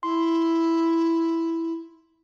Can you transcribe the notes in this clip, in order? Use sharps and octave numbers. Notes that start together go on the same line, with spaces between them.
E4 C6